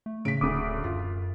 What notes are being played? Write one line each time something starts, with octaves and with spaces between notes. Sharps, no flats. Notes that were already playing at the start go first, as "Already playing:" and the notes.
A3
A2 C#3 B6 D7
D1 D2 C#3 D6 D#6
F#2 F4